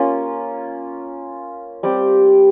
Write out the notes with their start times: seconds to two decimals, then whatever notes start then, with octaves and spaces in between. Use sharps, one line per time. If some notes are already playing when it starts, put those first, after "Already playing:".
Already playing: A#3 C#4 F4
1.83 G3 C4 G4